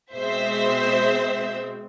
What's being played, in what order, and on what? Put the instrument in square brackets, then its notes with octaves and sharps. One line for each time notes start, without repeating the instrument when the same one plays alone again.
[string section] B2 G#3 C4 C5 E5